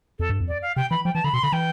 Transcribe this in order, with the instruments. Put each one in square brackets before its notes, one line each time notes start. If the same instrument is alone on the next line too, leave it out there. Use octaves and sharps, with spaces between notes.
[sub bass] F2 [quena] A4
[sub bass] G2
F2
[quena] D5
F5
[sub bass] C3 [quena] G5
[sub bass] E3 [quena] B5
[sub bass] F3 [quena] G5
[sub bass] E3 [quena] A5
[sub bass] D3 [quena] B5
[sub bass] B2 [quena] C6
[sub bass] D3 [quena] B5
[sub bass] E3 [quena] G5